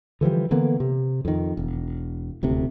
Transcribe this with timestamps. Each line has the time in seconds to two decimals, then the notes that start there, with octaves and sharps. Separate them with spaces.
0.21 D3 E3 F3 G3
0.51 D3 E3 A#3 B3
0.80 C3
1.25 F2 D#3
1.57 E1
2.43 D#1 D2 C3